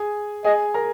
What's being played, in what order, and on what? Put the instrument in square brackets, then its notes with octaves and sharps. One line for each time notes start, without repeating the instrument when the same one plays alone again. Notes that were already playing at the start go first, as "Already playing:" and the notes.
Already playing: [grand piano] G#4 G#5
[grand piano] G#4 G#5 [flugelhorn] D#5
[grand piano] A#4 A#5